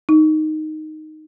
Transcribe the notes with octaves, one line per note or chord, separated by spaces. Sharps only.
D#4